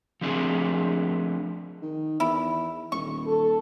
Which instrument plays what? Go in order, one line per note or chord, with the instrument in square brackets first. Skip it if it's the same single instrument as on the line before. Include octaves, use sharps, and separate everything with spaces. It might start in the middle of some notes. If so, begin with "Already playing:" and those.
[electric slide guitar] F3 A3 C4 D4 G#4
[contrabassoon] D#3
[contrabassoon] E2 [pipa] E4 G4
[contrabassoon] D#1 [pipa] C#6
[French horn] A4